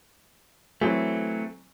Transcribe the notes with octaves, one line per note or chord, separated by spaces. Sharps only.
E3 F#3 A3 C4